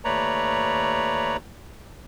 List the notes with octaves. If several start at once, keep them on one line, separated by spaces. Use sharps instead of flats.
D#2 A3 B4 C#5 D5 A#5